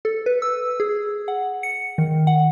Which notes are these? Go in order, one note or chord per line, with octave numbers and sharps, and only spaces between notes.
A4
B4
E6
G#4
F#5
C#7
D#3
F#5